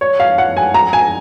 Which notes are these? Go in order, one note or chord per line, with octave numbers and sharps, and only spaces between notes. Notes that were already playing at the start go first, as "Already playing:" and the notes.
C#5
F5
F#5
G#5
A#5
G#5